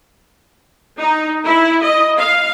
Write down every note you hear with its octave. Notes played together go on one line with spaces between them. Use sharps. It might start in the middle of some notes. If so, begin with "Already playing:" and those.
D#4
E4
D#5
F5